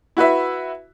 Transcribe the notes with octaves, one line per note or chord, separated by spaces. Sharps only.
E4 F#4 B4 E5